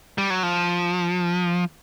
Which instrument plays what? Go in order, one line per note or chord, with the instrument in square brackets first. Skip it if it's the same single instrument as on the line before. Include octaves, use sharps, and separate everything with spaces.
[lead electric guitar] G3
F#3
F3